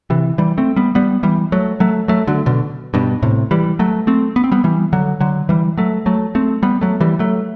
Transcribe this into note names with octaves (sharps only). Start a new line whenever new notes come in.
C3 E3
E3 G3
A3 C4
G3 B3
G3 B3
E3 G3
F#3 A3
F#3 A3
F#3 A3
D3 F#3
B2 D3
G2 B2
A2 C3
E3 G3
F#3 A3
A3 C4
B3
C4
G3 B3
E3 G3
D3 F#3
D3 F#3
E3 G3
F#3 A3
F#3 A3
A3 C4
G3 B3
F#3 A3
E3 G3
F#3 A3